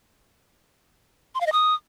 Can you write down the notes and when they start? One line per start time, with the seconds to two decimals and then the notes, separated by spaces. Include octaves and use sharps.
1.35 C6
1.41 F5
1.46 D#5
1.52 D#6